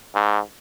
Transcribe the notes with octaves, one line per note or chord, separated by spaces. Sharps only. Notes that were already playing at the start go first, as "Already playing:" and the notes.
G#2